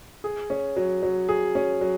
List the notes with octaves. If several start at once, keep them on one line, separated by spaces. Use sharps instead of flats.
G#4
C#4
F#3
F#3
G#4
C#4
F#3